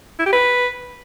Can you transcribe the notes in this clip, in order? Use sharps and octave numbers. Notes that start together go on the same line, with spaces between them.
E4
G4
B4